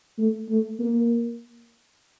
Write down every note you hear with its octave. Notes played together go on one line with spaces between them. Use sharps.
A3
A3
A#3